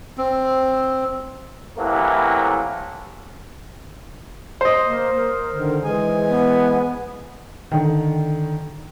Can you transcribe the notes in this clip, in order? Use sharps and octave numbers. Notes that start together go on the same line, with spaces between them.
C4
A2 C3 E3 F#3 A3 A#3
C5 D#5
A#3
A#4
D3 D#3
E3 G#3 G#4 G#5
B3
D3 D#3